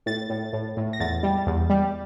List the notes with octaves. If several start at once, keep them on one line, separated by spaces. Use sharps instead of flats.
A2 A6
A2
A2
A2
A#6
E2 A6
G3
E2
G3